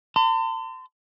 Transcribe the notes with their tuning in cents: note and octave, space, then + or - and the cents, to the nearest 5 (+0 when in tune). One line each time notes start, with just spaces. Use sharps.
A5 +45 C6 -35